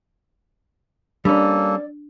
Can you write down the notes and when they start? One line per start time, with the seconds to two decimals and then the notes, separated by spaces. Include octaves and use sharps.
1.25 G3 A#3 C#4 D4 A4 D5